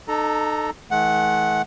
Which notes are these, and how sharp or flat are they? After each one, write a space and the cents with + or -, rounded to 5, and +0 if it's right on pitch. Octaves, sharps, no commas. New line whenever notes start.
D#4 -35 A4 +0 A#5 +0
E3 -40 A3 -45 F#5 +0